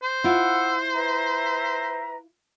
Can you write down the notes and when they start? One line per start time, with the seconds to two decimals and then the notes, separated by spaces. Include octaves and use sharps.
0.03 C5
0.24 E4 F4 F#5 E6
0.93 B4 E5 A#5